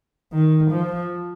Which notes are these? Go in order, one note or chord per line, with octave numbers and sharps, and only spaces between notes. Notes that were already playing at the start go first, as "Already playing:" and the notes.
D#3
F3